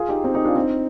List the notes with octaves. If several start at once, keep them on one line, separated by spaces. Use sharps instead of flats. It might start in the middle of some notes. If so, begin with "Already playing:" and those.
Already playing: F4 G#4
D#4 G4
C4 D#4
D#4 G4
D4 F4
C4 D#4